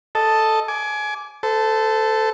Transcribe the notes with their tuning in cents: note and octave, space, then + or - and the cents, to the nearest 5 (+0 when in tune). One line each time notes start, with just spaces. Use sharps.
A4 +0 D#5 +0 A5 +0
G#5 +25 D6 -10
A4 +0 C5 -35